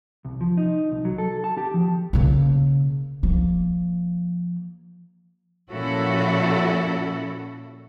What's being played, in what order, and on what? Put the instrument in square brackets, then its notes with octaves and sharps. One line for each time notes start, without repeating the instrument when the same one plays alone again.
[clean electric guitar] C2
F3
D#4
C2
F#3
A4
A5
G4
F3
[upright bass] C#3 A#3
F3 A#3
[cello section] A#2 F3 C#4 E4 F#4 A4